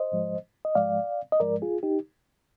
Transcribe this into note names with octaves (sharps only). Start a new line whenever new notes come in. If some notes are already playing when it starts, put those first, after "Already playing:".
Already playing: C5 D#5
G#2 F3 G#3
D#5
G#2 F3 G#3 D5 F5
D#5
G#2 F3 G#3 A#4 D5
F4 G#4
D#4 G4